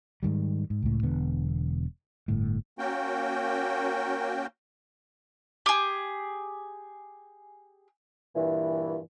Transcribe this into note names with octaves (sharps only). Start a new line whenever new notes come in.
G#2 D#3 G3
G#2
C#2 A2
E1 D3 B3
G1 A2
A#3 C#4 F#4 G5
G4 G#4
G2 A#2 E3